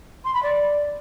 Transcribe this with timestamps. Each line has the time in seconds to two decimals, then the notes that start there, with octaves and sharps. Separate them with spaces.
0.24 C6
0.33 B5
0.42 D5